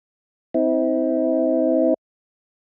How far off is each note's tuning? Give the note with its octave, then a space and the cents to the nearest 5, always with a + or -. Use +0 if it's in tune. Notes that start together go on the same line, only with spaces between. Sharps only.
C4 -10 E4 -40